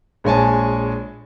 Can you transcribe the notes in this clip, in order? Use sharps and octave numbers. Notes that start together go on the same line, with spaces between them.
A#1 G#3 C#5 G#5 A5